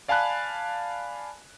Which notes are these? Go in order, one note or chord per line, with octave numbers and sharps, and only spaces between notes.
D5 F5 G#5 A5 B5 F#6